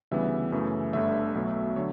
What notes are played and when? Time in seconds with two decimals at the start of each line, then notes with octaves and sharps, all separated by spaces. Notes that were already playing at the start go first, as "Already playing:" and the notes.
0.11 D2 C#3 E3 G3 B3 E5
0.52 F#2 C#3 E3 A3
0.93 G1 G2 D3 A3 E5
1.35 B1 B2 F#3 A3
1.76 D3 F#3 C#5